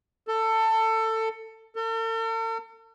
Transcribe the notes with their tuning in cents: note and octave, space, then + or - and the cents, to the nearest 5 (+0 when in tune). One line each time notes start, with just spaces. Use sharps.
A4 +20
A4 +45